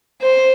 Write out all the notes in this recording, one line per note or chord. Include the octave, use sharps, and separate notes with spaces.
C5